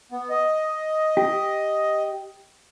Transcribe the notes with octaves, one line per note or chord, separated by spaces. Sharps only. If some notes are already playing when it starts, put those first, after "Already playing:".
B3
D#5
G4